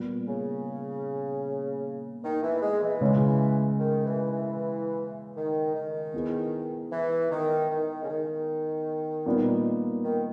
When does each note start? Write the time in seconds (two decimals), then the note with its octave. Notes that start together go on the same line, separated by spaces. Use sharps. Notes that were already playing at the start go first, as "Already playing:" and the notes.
Already playing: A#2 G3 B3
0.28 C#3
2.24 D#3
2.42 E3
2.62 G#3
2.81 E3
3.01 C#3 G#3 C#4
3.79 D#3
4.06 E3
4.32 E3
5.36 D#3
5.75 D#3
6.14 B3 E4 G#4 B4
6.91 E3
7.31 D#3
7.70 D#3
8.03 C#3
8.08 D#3
9.26 A#2 G3 B3 D#4 A#4
10.04 D#3